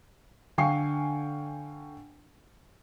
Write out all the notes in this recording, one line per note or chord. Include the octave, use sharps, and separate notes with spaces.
D3 F5 G5 G#5 C#6 C7